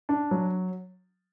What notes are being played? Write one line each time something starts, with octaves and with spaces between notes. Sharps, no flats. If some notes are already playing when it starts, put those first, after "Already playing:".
D4
F#3